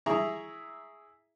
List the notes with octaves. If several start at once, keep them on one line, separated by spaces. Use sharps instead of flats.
E4 G#4 E5 A#5 C#6